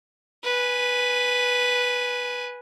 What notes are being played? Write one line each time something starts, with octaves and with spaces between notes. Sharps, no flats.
B4 G#5